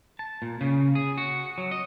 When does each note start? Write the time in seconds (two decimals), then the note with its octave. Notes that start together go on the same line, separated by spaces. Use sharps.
0.19 A5
0.42 A#2
0.61 C#3
0.95 G#4
1.17 F#4
1.58 F#3
1.71 D#5